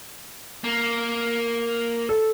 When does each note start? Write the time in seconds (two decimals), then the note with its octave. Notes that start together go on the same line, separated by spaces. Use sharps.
0.64 A#3
2.09 A4